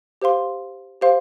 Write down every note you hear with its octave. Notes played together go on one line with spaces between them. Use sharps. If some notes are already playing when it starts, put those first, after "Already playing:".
G4 C5 F5 C6
G4 C5 F5 C6